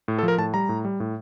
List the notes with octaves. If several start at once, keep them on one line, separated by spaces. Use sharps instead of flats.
A2
A4
F3
A#4
A2 A5
G3 A#5
A2
G3
A2